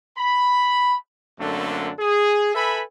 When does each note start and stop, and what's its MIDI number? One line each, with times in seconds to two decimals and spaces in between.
0.17 0.95 83
1.39 1.90 42
1.39 1.90 50
1.39 1.90 57
1.39 1.90 58
1.39 1.90 60
1.39 1.90 62
1.99 2.51 68
2.55 2.82 69
2.55 2.82 71
2.55 2.82 76
2.55 2.82 80
2.55 2.82 83